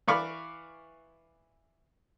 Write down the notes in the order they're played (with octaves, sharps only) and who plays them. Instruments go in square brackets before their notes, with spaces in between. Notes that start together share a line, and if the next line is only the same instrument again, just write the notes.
[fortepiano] E3 D5 F5 B5 C#6 D6